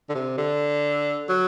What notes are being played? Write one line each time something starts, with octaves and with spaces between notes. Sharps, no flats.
D3
C3
D3
F#3